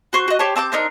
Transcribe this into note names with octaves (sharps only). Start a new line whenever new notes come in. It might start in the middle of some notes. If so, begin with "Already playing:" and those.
F#4 C5 C#6
F#4 D#5
G4 C5 C#5 A5
C4 A5 D6 G6
C4 D4 D#4 A#4